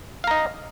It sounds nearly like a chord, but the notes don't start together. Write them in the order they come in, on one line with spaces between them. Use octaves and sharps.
F5 A#5 D#5